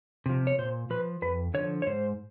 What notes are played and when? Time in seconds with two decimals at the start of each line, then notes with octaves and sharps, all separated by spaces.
0.26 C3 F3
0.47 C#5
0.58 A#2 C5
0.90 F3 B4
1.22 F2 B4
1.54 D3 F3 C#5
1.82 C#5
1.86 G#2 C5